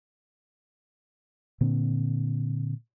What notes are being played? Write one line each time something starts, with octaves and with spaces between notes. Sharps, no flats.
A#2 D3 C4